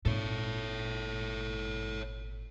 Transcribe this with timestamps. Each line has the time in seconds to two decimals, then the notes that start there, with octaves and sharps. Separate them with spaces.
0.05 G#1 A#2 A4 C#5